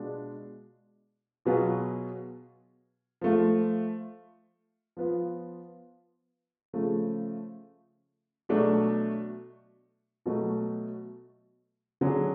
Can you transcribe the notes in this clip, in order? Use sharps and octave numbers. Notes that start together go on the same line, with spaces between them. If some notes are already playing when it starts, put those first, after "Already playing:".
Already playing: B2 G#3 D4 F4
B2 F#3 B3 F4 G#4
F3 A3 F4
F3 B3 F4
C#3 F3 A3
B2 F#3 A3 D4
B2 F#3 A3
D3 F#3 C#4 G#4